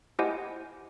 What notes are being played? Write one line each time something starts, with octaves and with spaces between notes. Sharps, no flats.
E4 G4 C5 D#5 F#5 G#5